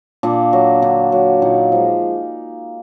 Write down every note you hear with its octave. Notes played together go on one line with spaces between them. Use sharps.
A#2 D4
F#3
D3
F#3
A#2 D#4
F3 G#3